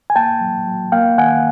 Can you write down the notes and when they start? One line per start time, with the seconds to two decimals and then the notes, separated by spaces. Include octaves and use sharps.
0.10 G#5
0.16 A#3 G5 A5
0.41 F#3
0.67 F#3
0.92 A#3 F5 G5
1.18 D#3 F#5 G#5